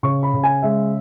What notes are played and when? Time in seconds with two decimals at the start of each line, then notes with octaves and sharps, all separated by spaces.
0.03 C#3 C#6
0.23 B5
0.34 C#3
0.43 G#5
0.62 G#3 E5